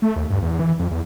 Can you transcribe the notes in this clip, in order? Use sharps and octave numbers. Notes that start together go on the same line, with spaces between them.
A3
D#2
G2
E2
E3
F2
E2